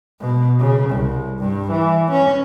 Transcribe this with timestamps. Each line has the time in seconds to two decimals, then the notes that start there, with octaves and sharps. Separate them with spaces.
0.21 B2
0.59 C#3
0.90 C2
1.39 G2
1.71 E3
2.11 C#4